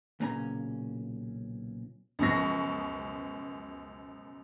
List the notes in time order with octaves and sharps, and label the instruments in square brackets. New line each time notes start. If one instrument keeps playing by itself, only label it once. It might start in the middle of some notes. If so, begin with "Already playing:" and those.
[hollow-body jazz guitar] B1 A#2 C#3 C#4 A#5
[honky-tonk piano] C#2 F#2 B2 F3 C#6 A#6